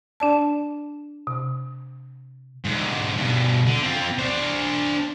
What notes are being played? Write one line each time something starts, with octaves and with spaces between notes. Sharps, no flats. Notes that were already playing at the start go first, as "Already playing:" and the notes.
D4 D5 A5
C3
G#2 D3
G2 B2
D3
C4 F4
D4 C5